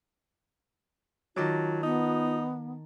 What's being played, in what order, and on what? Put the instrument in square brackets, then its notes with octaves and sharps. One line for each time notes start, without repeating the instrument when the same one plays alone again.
[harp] D#3 A5 D6 [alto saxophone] F#3 [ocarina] F4
[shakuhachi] B3 [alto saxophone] D#4